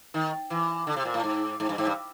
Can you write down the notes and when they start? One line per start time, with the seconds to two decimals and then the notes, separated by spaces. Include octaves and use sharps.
0.14 D#3
0.50 E3
0.87 D3
0.96 C3
1.05 A#2
1.14 A2
1.24 G#2
1.60 G#2
1.69 G2
1.78 G#2
1.87 G2